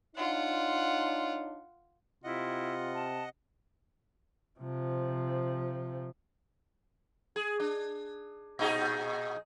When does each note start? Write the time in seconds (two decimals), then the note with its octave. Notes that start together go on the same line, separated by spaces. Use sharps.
0.16 D4 D#4 F4 C#5 F#5
2.24 C3 E4 F4 D#5 F#5
2.94 A5
4.60 C3 F3
7.36 G#4
7.60 D4
8.59 A#2 D#4 G#4